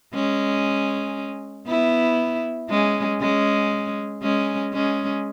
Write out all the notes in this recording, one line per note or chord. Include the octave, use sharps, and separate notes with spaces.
G#3 C#4
B3 E4
G#3 C#4
G#3 C#4
G#3 C#4
G#3 C#4